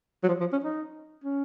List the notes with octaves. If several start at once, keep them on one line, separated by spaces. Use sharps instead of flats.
F#3
F3
F3
C#4
D#4
C#4